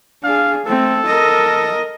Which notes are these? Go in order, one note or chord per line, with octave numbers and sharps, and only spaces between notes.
D4 G#4 F5
A3 C4 A4
A#4 D#5